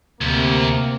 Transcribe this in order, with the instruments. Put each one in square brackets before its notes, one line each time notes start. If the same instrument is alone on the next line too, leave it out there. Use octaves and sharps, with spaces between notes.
[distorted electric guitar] D2 [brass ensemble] C3 A#3